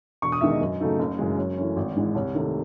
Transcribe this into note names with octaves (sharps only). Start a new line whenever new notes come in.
E1 C#6
D#6
E2 D#3 G#3 E5
D#5
F#2
C#3 F#3 A3 D#4
F#1
F#2 C#3 E3 G#3
F#2 C#5
E3 A3 C#4
G#1
G#2 E3 G#3
C2 C#5
C3 D#3 A3